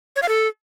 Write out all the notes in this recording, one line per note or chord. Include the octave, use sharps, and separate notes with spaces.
C#5
F5
A4